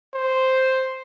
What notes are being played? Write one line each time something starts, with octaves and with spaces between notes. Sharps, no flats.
C5